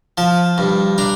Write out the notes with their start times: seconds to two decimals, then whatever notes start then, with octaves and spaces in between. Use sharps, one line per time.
0.18 F3 A5
0.58 G2
0.98 D4 A#5